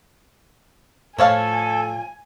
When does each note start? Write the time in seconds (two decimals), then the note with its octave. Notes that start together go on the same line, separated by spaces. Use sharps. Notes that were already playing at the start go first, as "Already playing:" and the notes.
1.18 A2 F3 A4 C#5 F5 G#5